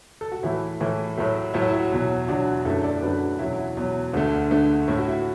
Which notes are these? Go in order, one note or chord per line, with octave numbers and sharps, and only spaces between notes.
A4
F#4
A2 E3 A3 E4
A2 E3 A3
A2 F#3 A3
A2 F#3 A3 E4
F#4
E4
E2 B2 F#3
E2 B2 F#3 D4 F#4
F#2 D3 A3 E4 A4
A4 D5
A4
F#2 D3 A3 F#4 B4
E2 B2 F#3 E4
E4
E2 B2 F#3
D2 D3 A3
D2 D3 A3
A2 A3 E4
F#4
E4